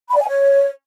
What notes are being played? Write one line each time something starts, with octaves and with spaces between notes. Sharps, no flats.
B5
D5
G#5
C#5